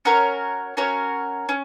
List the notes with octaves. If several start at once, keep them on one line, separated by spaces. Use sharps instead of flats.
C#4 F#4 A#4 C#5
C#4 F#4 A#4 C#5
C#4